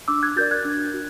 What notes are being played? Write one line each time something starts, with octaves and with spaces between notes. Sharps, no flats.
D4 D6 E6
F#6 G#6
F#4 A#4 D5 G6 A6
F#6 G#6
D4
F#4